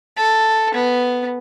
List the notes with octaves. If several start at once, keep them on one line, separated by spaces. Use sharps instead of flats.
A4
B3